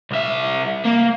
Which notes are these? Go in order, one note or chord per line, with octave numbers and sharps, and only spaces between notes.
C2 E5
A#3